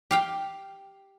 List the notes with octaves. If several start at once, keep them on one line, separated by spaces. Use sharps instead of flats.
G4 F5 G5